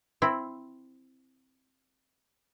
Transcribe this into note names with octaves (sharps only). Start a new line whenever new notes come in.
C4 E4